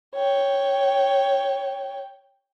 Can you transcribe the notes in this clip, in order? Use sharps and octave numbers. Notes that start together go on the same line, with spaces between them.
C#5 G5